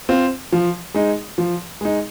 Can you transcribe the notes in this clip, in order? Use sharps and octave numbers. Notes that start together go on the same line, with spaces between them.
C4 F4
F3
G#3 D#4
F3
G#3 D#4